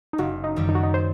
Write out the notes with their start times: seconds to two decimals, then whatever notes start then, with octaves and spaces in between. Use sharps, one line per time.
0.13 D#4
0.18 F#1 F#4
0.44 D#4
0.56 F#2 D#3 G3
0.69 D#4
0.75 F#4
0.83 D#4
0.94 C5